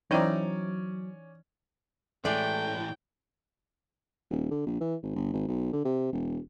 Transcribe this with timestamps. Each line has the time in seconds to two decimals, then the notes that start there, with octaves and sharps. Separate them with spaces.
0.11 E3 F#3 C#4 D#4 E4 C5 D5 G5
2.25 A2 E3 G#3 A3 D5 G5
4.30 D#1
4.51 D3
4.66 A#1
4.80 E3
5.03 G#1
5.16 G1
5.33 G#1
5.48 B1
5.73 D3
5.85 C3
6.13 E1